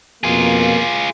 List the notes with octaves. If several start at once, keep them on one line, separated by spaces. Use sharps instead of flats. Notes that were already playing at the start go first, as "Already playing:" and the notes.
F2 B2 A#3 F4 G#4